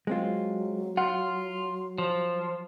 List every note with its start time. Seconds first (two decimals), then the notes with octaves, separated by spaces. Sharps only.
0.07 F#3 G#3 C4 F4
0.97 F4 F#5
1.98 F3